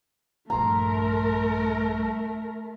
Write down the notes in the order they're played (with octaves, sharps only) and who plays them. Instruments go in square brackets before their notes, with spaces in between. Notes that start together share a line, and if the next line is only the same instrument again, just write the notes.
[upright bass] A#1 G2 [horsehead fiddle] A3 [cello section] A#4 [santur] A#5 C6